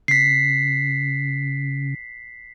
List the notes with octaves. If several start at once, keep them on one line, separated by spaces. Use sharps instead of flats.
C#3 B6 C7